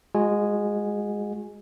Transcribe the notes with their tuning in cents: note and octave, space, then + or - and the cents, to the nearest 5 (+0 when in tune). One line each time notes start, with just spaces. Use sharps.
G#3 -10 F#4 -40 G#5 +0